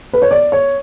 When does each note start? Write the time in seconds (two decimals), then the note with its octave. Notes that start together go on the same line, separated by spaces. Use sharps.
0.13 B4
0.22 C#5
0.31 D5
0.52 C#5